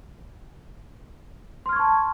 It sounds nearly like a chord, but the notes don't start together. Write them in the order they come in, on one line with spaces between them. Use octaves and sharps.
C6 F6 G#6 C#6 A5